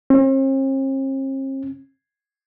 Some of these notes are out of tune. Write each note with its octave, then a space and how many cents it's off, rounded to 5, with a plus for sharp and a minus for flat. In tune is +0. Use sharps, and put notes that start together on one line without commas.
C4 +45